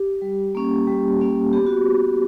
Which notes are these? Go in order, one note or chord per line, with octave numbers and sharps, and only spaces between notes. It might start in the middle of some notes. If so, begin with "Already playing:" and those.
Already playing: G4
G3
A#3 C#4
G3 G4
A#3 C#4
B3 G4
F#4